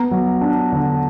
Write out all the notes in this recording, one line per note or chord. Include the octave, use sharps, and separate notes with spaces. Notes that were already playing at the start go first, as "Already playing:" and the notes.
Already playing: B3 A#5
F#3
D4
D3